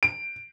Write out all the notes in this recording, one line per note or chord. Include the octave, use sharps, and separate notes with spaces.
D7